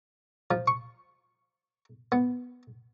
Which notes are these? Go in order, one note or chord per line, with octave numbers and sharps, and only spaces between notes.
F3
C#6
B3